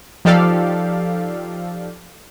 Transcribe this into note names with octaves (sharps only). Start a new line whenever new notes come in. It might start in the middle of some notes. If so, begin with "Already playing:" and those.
F3 D#4 G4 A4 D5 F5